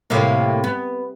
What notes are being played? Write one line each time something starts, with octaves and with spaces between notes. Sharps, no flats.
A2 C3 A#3
B3